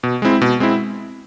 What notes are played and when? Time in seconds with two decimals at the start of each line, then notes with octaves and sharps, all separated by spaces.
0.03 B2
0.22 G#3 C4 E4
0.41 B2
0.60 G#3 C4 E4